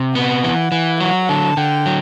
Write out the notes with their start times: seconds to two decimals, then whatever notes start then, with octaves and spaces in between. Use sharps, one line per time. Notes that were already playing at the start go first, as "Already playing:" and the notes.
Already playing: C3
0.15 B3 F#5
0.44 E3
0.72 E3
1.00 F#3 F#5
1.29 D3 A5
1.57 D3 G5
1.86 F#3